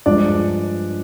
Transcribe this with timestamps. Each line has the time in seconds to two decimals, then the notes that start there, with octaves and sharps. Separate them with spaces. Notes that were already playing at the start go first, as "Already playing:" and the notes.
0.06 G2 F3 G#3 D4 D5